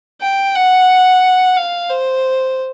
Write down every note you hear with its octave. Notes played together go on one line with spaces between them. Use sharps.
G5
F#5
F5
C5